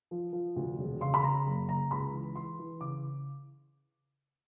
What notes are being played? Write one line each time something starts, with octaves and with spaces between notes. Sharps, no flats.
F3
F3
D2
E1
C#3 C6
B5
C#3 A#5
F#1
C#3 A#5
C#2 B5
E3
E3 C6
E3
C#3 D6